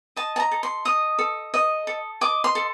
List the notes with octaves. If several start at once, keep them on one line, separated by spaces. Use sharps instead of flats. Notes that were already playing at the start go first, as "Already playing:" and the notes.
D#5 A5
A5
A#5
A4
C6
D#5 D#6
A4
D#5
A4
D#5 D6
C6
A4